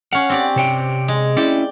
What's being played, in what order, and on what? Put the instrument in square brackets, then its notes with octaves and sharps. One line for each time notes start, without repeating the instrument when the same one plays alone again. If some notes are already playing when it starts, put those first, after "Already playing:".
[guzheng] C#4 F5 [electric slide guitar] F#5
[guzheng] C4 G4 D5
[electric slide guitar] C3 C#5 G5
[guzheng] G#3
[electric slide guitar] C#4 E4 [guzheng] D5 G5